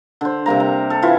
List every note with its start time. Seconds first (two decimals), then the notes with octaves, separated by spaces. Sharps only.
0.21 D3 C5
0.46 C3 G3 A#3 A#5
0.60 A#5
0.90 A4
1.02 E3 E4 F4